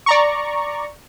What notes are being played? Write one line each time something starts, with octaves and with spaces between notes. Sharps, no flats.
D5 A#5 C#6